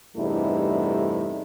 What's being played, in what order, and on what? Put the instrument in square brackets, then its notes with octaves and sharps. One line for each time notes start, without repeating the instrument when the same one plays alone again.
[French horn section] E2 G2 C3 A3 D#4 E4